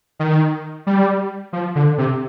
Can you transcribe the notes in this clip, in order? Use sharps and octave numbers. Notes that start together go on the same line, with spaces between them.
D#3
G3
F3
D3
C3